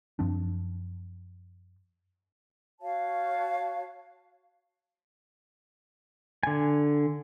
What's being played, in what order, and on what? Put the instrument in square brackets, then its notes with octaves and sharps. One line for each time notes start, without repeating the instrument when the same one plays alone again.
[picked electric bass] F#2 F3 C4 D4
[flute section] F#4 C#5 F5 A5
[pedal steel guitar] D3 G#5